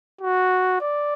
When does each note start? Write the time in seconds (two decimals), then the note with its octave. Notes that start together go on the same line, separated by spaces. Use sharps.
0.21 F#4
0.81 D5